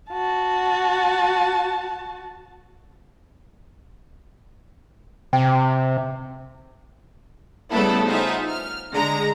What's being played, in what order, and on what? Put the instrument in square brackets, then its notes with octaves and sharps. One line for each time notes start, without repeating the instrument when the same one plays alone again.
[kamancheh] F#4 A5
[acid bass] C3 [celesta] G5
[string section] C#3 G3 A3 B3 E4 A4
D#4 F4 G#4 C5 E5 F#5
F6
D3 G#3 A#5 A#6